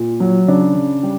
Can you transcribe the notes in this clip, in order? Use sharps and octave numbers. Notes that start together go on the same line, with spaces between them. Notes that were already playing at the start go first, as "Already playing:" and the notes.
Already playing: A#2
F#3
C#3 D4
C#3
G3